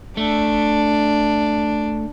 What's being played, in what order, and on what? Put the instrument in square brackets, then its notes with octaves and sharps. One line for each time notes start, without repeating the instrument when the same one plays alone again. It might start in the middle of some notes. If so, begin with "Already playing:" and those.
[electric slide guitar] A3 [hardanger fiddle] D4